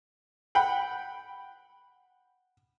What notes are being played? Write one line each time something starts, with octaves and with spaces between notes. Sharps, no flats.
F#5 G5 B5